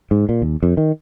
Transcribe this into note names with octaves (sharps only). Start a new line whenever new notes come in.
G#2
A#2
D#2
F2
D#3